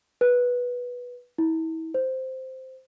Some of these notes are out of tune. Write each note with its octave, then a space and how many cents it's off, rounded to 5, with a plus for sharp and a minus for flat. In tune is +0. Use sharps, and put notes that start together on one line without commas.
B4 -10
E4 -35
C5 -5